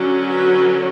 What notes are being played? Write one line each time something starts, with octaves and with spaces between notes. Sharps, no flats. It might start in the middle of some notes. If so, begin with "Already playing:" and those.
Already playing: D3 F#3 C#4
B4